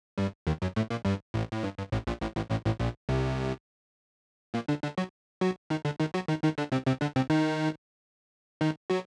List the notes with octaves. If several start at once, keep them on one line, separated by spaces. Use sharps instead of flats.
G2 G3
D#2 D#3
F#2 F#3
A2 A3
A#2 A#3
G2 G3
A1 A2
A2
G2
G2
A1 A2
A#1 A#2
A1 A2
A1 A2
A1 A2
A1 A2
A#1 A#2
C2 C3
A#2 A#3
D3 D4
D3 D4
F#3 F#4
F#3 F#4
D#3 D#4
D3 D4
D#3 D#4
F#3 F#4
D#3 D#4
D#3 D#4
D3 D4
C3 C4
C3 C4
D3 D4
C3 C4
D#3 D#4
D#3 D#4
F#3 F#4